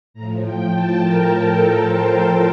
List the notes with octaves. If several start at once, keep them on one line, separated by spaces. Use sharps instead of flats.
A2 F3 A#5
G5
A5
A#4
A4
C5